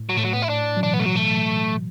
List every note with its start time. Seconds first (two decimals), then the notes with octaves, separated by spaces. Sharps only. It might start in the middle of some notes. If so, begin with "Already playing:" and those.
Already playing: A2
0.09 F#3
0.17 A2 A3
0.25 F#3
0.33 B3
0.42 E4
0.49 D4
0.77 F#3
0.83 B2 E3 D4
0.93 B3
0.99 A3
1.06 F#3
1.16 A3